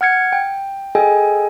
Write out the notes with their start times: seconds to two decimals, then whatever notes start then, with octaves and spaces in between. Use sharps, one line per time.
0.01 F#5 F6 G#6 C#7
0.33 G5
0.95 G#4 A4 D#5 G5 G#5